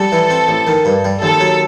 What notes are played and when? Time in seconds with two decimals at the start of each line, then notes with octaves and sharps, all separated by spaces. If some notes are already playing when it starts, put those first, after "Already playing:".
Already playing: G3 A4
0.12 E3
0.30 C4
0.48 A1
0.67 D#3
0.85 G2
1.05 G3
1.22 D#2 A4
1.40 F#3